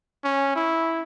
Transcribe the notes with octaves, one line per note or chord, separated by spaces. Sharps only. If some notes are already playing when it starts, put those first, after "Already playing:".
C#4
E4